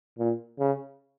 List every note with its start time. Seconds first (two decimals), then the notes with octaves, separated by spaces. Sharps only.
0.19 A#2
0.59 C#3